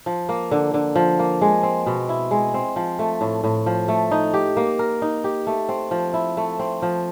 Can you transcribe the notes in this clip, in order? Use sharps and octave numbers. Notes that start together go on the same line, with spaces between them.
F3
A#3
D3
D3
F3
A#3
G#3
C4
B2
E4
G#3
C4
F3
A3
A2
A2
F3
A3
D#4
G4
A#3
A#4
D#4
G4
A3
C4
F3
E4
A3
C4
F3